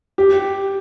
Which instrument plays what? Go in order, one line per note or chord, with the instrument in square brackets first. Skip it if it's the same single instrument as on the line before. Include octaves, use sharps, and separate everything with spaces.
[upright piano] G4